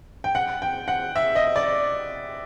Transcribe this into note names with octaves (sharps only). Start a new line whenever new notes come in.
G5
F#5
G5
F#5
E5
D#5
D5